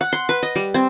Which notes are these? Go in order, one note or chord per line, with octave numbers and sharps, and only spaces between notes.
F#5
C6
B4
D#5
G3
C4